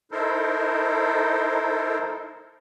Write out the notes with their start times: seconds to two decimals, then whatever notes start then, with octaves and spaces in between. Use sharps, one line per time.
0.11 D#4 E4 A4 A#4 C5